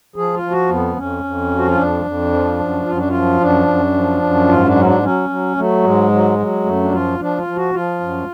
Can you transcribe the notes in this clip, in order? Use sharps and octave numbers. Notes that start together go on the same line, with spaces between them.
F3 G#4
F4
F3
F#4
F2 B3
F2 C#4
F2
F3
F#4
F4
F2 D4
F2
F3
F#2
F#2 F4
D4
F3 F4
F#2 D4
F#2
F3
F#2
G#2 F4
D4
F#3 C#4
D4
F#3 C#4
F#3
F#3 A3
G#2 G#3
F#3
F#3
F#2 A3
D4
F3 F4
F3 D4
F4
F3
F#4
F3 F4
F#2